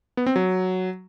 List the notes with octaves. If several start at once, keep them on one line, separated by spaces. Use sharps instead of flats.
B3
C4
F#3